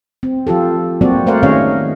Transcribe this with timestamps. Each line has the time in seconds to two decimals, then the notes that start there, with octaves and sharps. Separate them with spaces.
0.23 C4
0.47 F3 F4 G4 A4
1.01 F#3 G3 A#3 C4 F#4 D5
1.26 A3 A#4 C5 D5 F5 F#5
1.43 D#3 C#4 G#4 C#5 D#5 F5